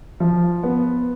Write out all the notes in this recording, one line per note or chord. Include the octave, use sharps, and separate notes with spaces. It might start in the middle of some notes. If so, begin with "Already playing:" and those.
F3
B3